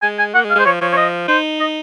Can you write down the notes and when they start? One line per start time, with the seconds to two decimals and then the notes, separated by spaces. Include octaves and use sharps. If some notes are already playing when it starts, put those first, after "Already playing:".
0.02 G#3 G#5
0.19 G#5
0.34 A#3 F#5
0.45 G#3
0.50 F5
0.55 G#3 C5
0.65 F3 C#5
0.81 F3 C#5
0.93 C#5
0.97 D#5
1.28 D#4 C5
1.60 D#5